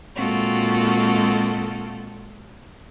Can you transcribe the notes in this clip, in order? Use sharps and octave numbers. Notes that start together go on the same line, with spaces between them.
A#2 G#3 C4 F4 F#4 A4